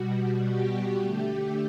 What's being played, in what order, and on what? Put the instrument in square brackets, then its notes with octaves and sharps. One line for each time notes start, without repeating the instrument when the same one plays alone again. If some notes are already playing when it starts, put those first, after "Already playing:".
Already playing: [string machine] B2 G3 F#4
G4
D3 A3